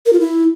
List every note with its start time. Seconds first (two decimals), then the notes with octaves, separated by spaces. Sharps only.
0.06 A#4
0.13 F4
0.20 E4